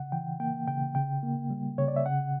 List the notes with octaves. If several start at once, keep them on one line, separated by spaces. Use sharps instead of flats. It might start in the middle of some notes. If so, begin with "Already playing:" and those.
Already playing: C#3 F#5
E3 G5
A#3 G5
C#3 G5
C#3 G5
A#3
G3
C#3 C#5
D5
E5
C#3 F#5